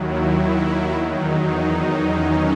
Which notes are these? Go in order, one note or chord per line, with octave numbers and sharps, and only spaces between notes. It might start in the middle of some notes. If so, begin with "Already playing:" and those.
Already playing: D#2 D#3 F#3 E4
E4
E2 D#3 F#3 D#4
D#4
D#4
C#4